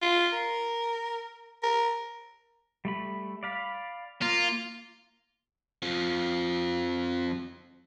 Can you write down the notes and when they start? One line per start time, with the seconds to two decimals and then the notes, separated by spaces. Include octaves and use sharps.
0.02 F4
0.33 A#4
1.63 A#4
2.85 G3 A3 B5
3.43 D5 F5 B5
4.22 A#3 F4
5.82 F2 F3